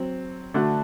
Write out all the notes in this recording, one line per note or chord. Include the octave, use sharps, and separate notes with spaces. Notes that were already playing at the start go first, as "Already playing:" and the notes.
Already playing: F#3 C4
D3 A3 D4 F#4